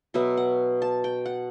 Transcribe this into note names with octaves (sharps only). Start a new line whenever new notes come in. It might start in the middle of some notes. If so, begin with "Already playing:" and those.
B2 F#3 B3 E5
F#5
A5
G5
F#5